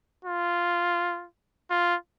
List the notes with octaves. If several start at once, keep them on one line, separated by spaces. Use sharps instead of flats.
F4
F4